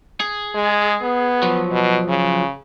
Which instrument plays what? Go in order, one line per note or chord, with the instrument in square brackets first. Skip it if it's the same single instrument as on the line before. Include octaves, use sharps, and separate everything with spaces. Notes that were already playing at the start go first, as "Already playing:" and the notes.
[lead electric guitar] G#4
[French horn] G#3
B3
[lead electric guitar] F3 F#3
[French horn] B2
C#3